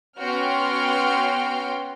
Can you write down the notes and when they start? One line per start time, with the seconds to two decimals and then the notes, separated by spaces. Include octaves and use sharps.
0.19 B3 C#4 F#4 G5 C6 F6